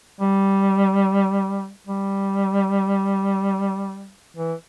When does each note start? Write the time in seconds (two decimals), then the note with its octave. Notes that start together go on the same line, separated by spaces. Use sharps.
0.20 G3
1.87 G3
4.37 E3